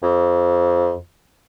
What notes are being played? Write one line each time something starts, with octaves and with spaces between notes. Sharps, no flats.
F2